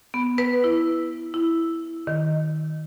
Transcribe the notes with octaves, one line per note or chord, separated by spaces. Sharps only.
B3
B4
E4
E4
D#3